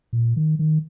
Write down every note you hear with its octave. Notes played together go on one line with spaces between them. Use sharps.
A#2
D#3
D#3